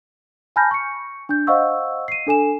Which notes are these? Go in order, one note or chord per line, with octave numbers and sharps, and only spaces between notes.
G#5 A5 B5 F6 G6 A#6
C#6 C#7
D4 G6
C5 D#5 F5 F#5 C#6 E6
C7 D#7
D4 A4 G#5 E7